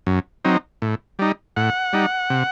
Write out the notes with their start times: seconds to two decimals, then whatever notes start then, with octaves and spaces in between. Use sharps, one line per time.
0.07 F#2
0.45 F#3 C4 D#4
0.82 A2
1.19 G3 D#4
1.56 A2 F#5
1.93 G3 D#4
2.30 C3